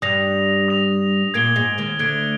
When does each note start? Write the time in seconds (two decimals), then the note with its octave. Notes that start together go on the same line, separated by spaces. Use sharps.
0.02 G2 G3 D#6 A#6 F7
0.68 D#6 A#6 F7
1.34 A#2 A#3 G#6 D7 G7
1.56 G#2 G#3
1.78 D#2 D#3
1.99 D2 D3 G#6 D7 G7